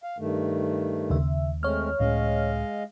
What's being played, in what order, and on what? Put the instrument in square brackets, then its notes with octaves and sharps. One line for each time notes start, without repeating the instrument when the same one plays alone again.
[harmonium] F5
G2 D#3 A3
[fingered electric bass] D#2 [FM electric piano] C#3 E5
[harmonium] G#3 A3 C4 [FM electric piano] C#5 F6
[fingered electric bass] C#2 A2 C#4 [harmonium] G#3 D#5 F5